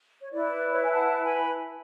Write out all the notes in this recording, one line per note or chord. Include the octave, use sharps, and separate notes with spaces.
C#5
E4 B4 D5
C#5 E5
E5 G#5
F#5 A5
G#5 B5